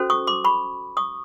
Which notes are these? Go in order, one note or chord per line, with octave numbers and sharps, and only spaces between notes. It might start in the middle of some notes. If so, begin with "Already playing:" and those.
Already playing: C#4 F#4 A4 C5
C#6 D#6
C6 D6
B5 C#6
C#6 D#6